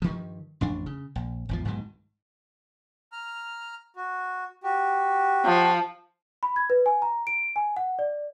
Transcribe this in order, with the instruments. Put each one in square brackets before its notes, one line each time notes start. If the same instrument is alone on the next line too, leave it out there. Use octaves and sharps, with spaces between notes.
[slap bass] G2 D#3 F3
A1 F2 D4
C#3
A#1
G#1 E2 F3
B1 G#2 B2 D#3
[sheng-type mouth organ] A#5 F6
F#4
F#4 G4
[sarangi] F3
[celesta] B5
G#6
B4
G#5
A#5
D7
G#5
F#5
D5